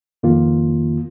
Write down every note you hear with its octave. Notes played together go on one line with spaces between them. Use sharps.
F2 D#3 A#3 F4